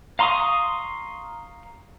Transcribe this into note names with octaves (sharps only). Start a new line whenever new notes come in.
F5 A#5 C6 C#6 D#6